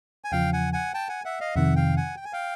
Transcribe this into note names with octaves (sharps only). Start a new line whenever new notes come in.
G#5
E2 C#3 F3 F5 G5
F#5 G#5
F#5 G#5
G5 A5
F#5 G#5
E5 F#5
D#5 F5
F2 C3 D#3 E5 F#5
F5 G5
F#5 G#5
G5
G#5
F5 G5